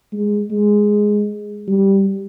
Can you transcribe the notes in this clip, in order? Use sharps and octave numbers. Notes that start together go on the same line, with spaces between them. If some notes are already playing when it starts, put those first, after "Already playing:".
G#3
G#3
G3